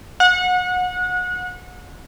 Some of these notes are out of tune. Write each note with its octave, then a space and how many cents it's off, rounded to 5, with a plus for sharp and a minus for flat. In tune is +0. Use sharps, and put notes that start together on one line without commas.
F#5 -30